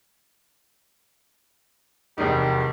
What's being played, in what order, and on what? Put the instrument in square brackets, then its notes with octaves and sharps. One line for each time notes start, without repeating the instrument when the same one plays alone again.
[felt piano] F1 E2 D#4 [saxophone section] D#3 G3